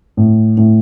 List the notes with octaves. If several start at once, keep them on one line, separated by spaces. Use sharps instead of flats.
A2
A2